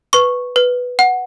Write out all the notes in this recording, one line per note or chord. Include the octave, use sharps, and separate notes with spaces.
B4 C#6
B4
F#5